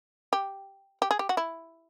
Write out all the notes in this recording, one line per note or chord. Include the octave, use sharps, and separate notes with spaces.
G4
G4
G#4
G4
F#4
E4